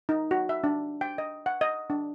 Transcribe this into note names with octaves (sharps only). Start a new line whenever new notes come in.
D#4
F#4
E5
D4
G5
D#5
F#5
D#5
D4